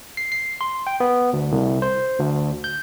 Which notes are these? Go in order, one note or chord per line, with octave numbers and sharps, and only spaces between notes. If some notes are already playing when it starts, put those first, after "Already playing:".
C7
C7
C6
G5
B3
D2
C2
C5
D2
G6